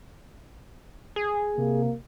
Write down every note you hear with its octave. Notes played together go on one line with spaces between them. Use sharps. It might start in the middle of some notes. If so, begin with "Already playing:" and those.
G#4
C3 A#3